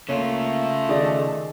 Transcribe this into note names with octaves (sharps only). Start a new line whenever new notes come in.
C#3 A3 A#3 F4 C#5
D#3 G#4 D5 D#5